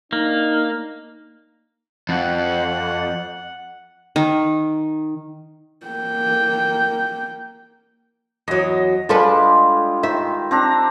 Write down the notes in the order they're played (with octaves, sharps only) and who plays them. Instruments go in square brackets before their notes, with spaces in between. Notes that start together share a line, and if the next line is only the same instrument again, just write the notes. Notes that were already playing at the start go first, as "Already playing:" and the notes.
[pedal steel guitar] A#3 [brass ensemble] D4 D#4
[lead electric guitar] F2 [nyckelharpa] F#5
[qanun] D#3
[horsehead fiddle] A#3 G5
[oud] E2 F#3 [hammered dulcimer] D#5
[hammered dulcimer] G3 G#3 F4 [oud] D4 A4 B4
[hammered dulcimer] D#3 [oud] E5
[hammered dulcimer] C4 D4 A#5